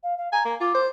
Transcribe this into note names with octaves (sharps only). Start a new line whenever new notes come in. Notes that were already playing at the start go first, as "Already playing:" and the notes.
F5
F5
G#5 A#5
A#3
F4 D6
C5